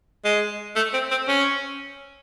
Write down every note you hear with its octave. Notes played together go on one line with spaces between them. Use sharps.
G#3
A3
C4
C4
C#4